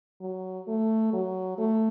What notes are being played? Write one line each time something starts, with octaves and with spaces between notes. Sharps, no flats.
F#3
A3
F#3
A3